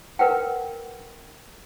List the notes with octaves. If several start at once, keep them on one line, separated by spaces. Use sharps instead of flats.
A#4 B4 F#5 G5